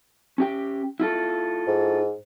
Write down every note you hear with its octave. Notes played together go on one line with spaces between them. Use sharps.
C#4 G4 G5
E4 F4 A4
G#2